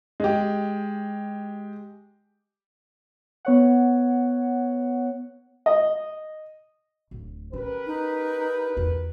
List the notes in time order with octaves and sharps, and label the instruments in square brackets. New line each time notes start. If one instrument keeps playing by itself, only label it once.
[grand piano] G#3 G4
[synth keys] B3 C#5 F#5
[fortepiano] D#5
[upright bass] D1
[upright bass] C#4 [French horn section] G4 A#4 B4
[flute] D#4
[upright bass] E2 F4